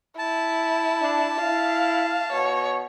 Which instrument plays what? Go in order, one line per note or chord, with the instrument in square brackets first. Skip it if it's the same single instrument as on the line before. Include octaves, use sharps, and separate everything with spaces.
[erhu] E4 [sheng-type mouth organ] A5
[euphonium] D4
[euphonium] E4 [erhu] F5
[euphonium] B2 [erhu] C#5